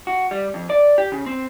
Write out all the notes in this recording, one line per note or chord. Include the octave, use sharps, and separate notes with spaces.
F#4
G3
F2
D5
G4
C#3
C4